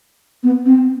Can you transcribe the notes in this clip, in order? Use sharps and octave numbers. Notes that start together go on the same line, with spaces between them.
B3
C4